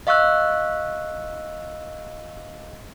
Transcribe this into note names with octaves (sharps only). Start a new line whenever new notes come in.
D#5 F5 C#6 E6 F#6